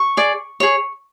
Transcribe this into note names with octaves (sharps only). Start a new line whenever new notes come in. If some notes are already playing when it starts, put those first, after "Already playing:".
Already playing: C#6
G#4 D5
G#4 C#5